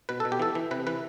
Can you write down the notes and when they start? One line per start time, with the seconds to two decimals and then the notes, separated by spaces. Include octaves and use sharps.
0.09 B2 B4
0.20 B2 A4
0.32 G4
0.40 E3 A4
0.55 E3
0.71 C3 B4
0.87 E3 B4